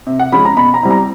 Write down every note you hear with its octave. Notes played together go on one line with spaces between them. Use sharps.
C3
F#5
F3 G#3 C#4 B5
A#5
B2 B5
A#5
G3 C4 E4
A#5